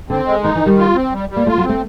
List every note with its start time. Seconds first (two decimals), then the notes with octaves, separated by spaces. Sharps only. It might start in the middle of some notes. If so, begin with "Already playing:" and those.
0.09 D3 C4
0.27 G#3
0.43 D#3 D#4
0.55 E3
0.61 D#3
0.66 G3
0.78 F4
0.95 C4
1.13 G3
1.29 G3
1.36 A#3
1.47 A3 F4
1.58 F#3
1.63 C4
1.69 A3